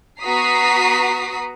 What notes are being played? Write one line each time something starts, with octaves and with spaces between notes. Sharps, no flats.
B3 F#4 A#5 D#6 B6 C7